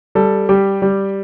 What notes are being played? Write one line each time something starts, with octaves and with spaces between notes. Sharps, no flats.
G3 A4
G3 G4
G3